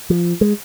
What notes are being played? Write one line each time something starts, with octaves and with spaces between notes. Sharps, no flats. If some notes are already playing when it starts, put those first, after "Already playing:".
F3
G#3